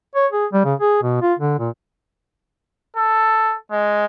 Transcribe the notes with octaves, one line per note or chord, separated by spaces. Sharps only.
C#5
G#4
G3
C#3
G#4
B2
F4
D3
A#2
A4
G#3